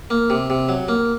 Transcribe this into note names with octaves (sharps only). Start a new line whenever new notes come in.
A#3
C3
C3
F#3
A#3